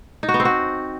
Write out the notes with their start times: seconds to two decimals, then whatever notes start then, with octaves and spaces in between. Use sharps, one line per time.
0.23 D#4
0.28 F#4
0.34 B3
0.40 C4
0.45 F#4